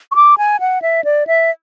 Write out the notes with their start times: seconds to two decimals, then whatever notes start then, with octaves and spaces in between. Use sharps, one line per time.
0.12 C#6
0.16 D6
0.38 G#5
0.60 F#5
0.82 E5
1.04 D5
1.27 E5